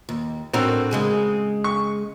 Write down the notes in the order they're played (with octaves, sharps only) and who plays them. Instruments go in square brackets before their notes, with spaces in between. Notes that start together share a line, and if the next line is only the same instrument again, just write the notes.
[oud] D#2
[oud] A2 D4 A#4 [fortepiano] C4 F#4 E6
[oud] C#3 G#3 G#4
[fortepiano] C#6